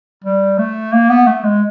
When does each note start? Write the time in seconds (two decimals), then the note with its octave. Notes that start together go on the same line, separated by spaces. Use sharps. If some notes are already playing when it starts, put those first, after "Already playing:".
0.24 G3
0.58 A3
0.93 A#3
1.10 B3
1.27 A3
1.44 G#3